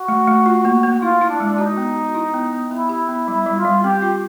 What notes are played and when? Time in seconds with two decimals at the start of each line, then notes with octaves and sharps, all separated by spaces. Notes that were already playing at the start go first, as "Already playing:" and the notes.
Already playing: F#4
0.08 A3
0.28 A3
0.46 F4
0.65 A#3
0.83 A#3
1.02 E4 F4
1.21 E4
1.30 D4
1.40 G#3
1.58 D#4 F#4
1.77 B3
1.95 F#4
2.15 E4
2.34 B3
2.53 B3
2.71 B3 E4
2.89 G4
3.08 B3
3.27 G3 E4
3.46 G3
3.56 F4
3.65 G3
3.83 C4 G4
4.02 F4